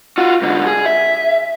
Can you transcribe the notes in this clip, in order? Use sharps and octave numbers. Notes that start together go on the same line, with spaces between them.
F4 F#4
G#2 D3
G#4
E5